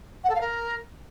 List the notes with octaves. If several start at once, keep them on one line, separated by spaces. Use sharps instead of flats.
F#5
A4
F5
A#4